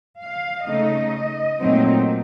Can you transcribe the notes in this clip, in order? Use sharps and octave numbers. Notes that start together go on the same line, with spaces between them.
F5
C#3 A3 D#4 D#5
A#2 F#3 A3 C4 D#4